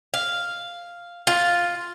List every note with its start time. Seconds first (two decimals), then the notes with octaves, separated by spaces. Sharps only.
0.14 F5
1.27 F4